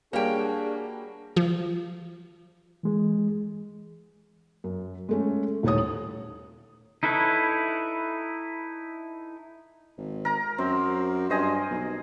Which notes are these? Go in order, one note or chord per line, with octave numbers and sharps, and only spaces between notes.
G3 A#3 D4 F#4 G#4 C#5 G5
F3
E3 G#3 G#4
F#2
G#3 A3 C#4
D#1 A2 D#4 A4 C#5 D#6
D#4 E4 A4 B4 C#5
G#1
A#4 A#5
F#2 C4
G2 C5 D#5 G#5
B1